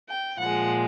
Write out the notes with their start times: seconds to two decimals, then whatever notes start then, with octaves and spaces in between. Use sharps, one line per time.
0.09 G5
0.39 A#2 F3 G#3 F#5